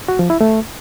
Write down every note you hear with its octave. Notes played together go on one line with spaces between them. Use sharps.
F#4
F3
E4
A3